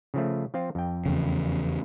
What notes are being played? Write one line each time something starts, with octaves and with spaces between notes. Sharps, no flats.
C#3 F3 A3
F3 C4 F4
F2 G5
E2 C#3